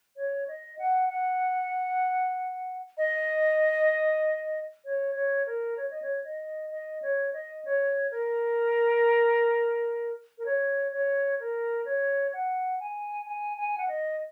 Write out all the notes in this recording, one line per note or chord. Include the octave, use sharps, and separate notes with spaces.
C#5
D#5
F#5
F#5
D#5
C#5
C#5
A#4
C#5
D#5
C#5
D#5
D#5
C#5
D#5
C#5
A#4
A#4
C#5
C#5
A#4
C#5
F#5
G#5
G#5
G#5
F#5
D#5